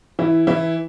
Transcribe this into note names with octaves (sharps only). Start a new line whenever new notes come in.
E3 E4
E3 E4